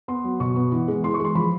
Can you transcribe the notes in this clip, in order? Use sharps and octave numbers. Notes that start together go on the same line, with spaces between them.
B3 C6
F#3
B2 C#6
B3
E3
G#3
E3 C6
C#6
G#3
C6
F3 B5